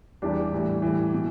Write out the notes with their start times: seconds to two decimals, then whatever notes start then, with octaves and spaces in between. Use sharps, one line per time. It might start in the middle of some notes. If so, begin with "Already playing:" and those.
0.22 E2 E3 G3 D4 G4
0.52 A2 E3 G3
0.82 A2 E3 G3
1.14 B2